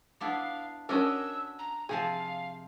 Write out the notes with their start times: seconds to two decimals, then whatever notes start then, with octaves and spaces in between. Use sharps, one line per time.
0.21 B3 D4 E4 F5
0.89 C#4 D4 F#4 A#4 D#5 E6
1.59 A#5
1.89 C3 F3 G#4 F5 A5